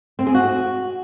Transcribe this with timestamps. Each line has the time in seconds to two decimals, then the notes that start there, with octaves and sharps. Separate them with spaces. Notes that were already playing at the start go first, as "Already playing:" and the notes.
0.19 C4
0.27 G#4
0.34 F#4